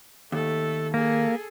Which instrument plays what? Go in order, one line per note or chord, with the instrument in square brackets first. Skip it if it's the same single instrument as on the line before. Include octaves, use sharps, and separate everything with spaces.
[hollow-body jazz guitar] D#2 [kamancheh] A3 A4
[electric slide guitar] A#3 [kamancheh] G#4 A4